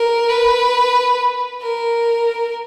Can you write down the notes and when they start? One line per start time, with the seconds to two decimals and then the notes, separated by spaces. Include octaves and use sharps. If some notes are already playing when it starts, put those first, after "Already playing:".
Already playing: A#4
0.29 B4
1.63 A#4